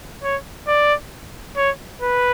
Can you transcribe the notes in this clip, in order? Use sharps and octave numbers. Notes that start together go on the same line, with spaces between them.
C#5
D5
C#5
B4